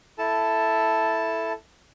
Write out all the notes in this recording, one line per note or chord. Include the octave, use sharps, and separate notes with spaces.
E4 A4 A5